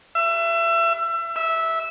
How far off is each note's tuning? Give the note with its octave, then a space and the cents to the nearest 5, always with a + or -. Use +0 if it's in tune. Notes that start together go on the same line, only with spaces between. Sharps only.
E5 +30
E5 -10